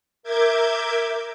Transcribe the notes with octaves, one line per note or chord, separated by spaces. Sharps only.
A#4 E5 D6 G6 G#6